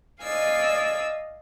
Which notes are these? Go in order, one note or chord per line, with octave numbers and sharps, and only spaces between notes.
D5 D#5 F5 G#5 E6